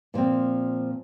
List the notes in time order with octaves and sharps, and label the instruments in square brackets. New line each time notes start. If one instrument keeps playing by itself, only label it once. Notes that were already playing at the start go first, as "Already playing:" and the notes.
[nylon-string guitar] A#2 F3 C4